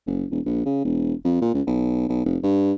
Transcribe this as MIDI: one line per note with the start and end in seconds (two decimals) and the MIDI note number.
0.07 0.25 30
0.31 0.40 28
0.46 0.65 34
0.66 0.84 49
0.85 1.13 28
1.25 1.36 41
1.42 1.50 46
1.54 1.62 37
1.67 2.05 35
2.09 2.23 35
2.26 2.38 29
2.43 2.73 43